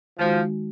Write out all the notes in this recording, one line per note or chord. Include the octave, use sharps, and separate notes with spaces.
D#3 F3 G#3 D#4 F#4